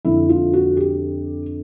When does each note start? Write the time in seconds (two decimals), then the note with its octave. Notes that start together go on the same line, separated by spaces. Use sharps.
0.05 F2 D3 E4
0.29 F4
0.53 F#4
0.77 G4